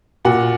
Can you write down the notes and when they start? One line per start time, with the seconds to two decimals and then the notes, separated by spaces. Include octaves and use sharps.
0.25 A#2 F#4 F#5